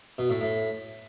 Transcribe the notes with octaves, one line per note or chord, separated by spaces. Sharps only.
B2
A2
A2